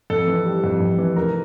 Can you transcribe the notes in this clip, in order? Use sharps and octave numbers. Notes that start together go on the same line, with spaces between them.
F2 A4
E3
G3
F2
F2
E3
F1 A#4